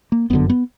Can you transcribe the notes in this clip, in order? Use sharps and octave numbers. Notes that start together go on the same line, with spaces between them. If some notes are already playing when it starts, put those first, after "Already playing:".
A#3
G1 F#2 D3 B3
B3